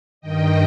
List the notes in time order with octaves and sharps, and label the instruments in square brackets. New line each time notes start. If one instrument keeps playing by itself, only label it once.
[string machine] G2 D#3 D#5 G5